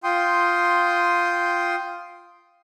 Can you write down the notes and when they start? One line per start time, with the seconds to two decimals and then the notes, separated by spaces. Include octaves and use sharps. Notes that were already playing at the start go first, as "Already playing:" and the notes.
0.04 F4 G5 C6 D#6